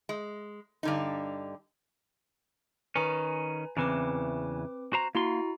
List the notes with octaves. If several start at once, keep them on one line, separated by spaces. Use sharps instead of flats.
G#3
G2 D3 D#4
D#3 C#4 B4 G#5 A#5
E2 C#3 E3 C4 B4 D6
F#4 C5 A#5
A#3 E4 F#4 A#5 C6